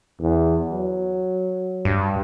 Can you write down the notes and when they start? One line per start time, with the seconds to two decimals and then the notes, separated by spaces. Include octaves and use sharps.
0.20 E2
0.71 F#3
1.85 G2